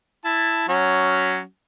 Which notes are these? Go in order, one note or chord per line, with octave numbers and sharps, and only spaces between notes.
E4 A5
F#3 C#4 F#4